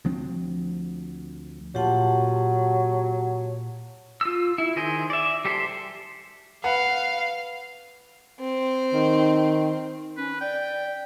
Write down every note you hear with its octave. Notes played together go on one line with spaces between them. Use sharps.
D2 F3 C4 D4
A#2 F#3 F4 G4 F#5 A5
F4 E6
E4
D#3 G#4 C5
D5 E5
G3 G4 A4 C5
B4 F5 F#5
C4
D#3
C#4 B4
D5 G5